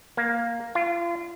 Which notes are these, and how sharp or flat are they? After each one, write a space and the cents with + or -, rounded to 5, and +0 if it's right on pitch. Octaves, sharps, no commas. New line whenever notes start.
A#3 +0
F4 -35